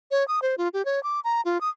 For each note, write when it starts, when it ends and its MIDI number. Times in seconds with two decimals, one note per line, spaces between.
0.11 0.26 73
0.28 0.40 87
0.42 0.55 72
0.58 0.68 65
0.74 0.85 67
0.85 1.02 73
1.03 1.20 86
1.24 1.41 82
1.45 1.61 65
1.61 1.69 87